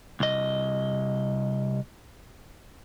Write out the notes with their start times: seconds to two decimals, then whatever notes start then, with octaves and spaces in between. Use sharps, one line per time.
0.20 C2 D#5